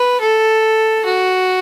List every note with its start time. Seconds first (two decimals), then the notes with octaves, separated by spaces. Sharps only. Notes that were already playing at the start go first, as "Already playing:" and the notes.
Already playing: B4
0.21 A4
1.05 F#4